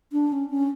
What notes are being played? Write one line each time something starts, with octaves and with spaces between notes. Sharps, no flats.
D4
C#4
C#4